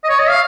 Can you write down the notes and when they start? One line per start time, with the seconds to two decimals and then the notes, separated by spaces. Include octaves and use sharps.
0.04 D#5
0.09 C#5
0.19 D#5
0.29 F5